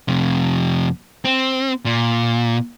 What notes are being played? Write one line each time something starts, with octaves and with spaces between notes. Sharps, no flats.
F2 C3
C4
A#2